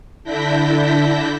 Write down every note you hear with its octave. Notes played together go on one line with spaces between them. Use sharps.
D3 D4 E4 G6 A#6 B6